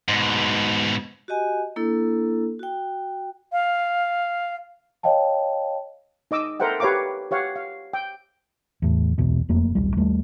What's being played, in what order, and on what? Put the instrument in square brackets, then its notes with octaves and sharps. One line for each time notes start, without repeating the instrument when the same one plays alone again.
[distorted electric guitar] G#2 B2
[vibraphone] F#4 G4 D#5 G#5
A#3 D4 E4 A4
F#4 G5
[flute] F5
[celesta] C#5 D#5 F5 G5 A5
[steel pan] D#4 D#5 D6 E6
A4 A#4 C5 E5 F#5 G5
G4 B4 C#5 F5 A#5 D6
G4 C#5 F5 F#5
F5
G5
[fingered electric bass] E2 A2
D1 B1 E2 B2
E1 F2 A3 A#3
D#1 B1 G3
D#2 G3 A3